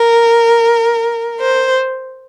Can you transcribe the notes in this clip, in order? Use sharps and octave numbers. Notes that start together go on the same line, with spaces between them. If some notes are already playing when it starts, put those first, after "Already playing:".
Already playing: A#4
C5